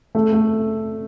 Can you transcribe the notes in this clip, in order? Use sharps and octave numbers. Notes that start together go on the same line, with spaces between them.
A3
A3